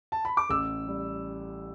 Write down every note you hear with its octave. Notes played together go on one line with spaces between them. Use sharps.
A5
B5
D6
A1 E6
G3